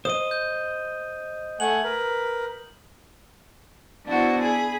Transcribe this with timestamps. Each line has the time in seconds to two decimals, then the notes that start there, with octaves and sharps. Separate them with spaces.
0.05 C5 D#5 D#6 D#7
0.31 G6
1.60 A3 F#5 G#5 F#7
1.84 A#4 B4
4.06 B3 D4 E4 F#4 C5
4.41 G#4 B5